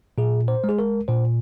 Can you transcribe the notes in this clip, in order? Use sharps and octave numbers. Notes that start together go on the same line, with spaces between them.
A#2 G#4
C5
G#3
G#4
A#4
A#2 C5